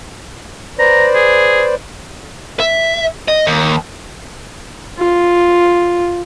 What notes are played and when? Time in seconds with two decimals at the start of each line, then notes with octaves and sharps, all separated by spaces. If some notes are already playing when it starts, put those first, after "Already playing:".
0.79 B4 C5 D5 A#5
1.15 G#4
2.60 E5
3.28 D#5
3.47 D#2
4.98 F4